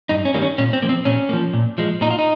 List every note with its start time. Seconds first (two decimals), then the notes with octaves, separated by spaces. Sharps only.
0.09 G2 D#4
0.25 C#4
0.34 D#3 G3 A#3
0.42 C#4
0.58 A#2 C#4
0.73 C4
0.82 F3 A#3
0.89 C4
1.05 A#2 C#4
1.29 F3 A#3
1.53 A#2
1.78 F3 G#3
2.01 A#2 D#4
2.10 F4
2.19 D#4